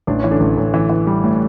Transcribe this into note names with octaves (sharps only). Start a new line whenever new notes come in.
A1 D4
E3 C#4
D3 D4
A1
A1
E3
E3
G3
A2